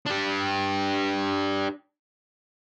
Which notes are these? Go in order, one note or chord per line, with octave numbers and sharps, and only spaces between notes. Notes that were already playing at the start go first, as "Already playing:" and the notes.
D4 G4